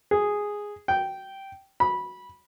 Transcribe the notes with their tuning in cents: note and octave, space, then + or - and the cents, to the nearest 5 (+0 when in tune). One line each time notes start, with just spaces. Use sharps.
G#4 -5
G5 -10
B5 -15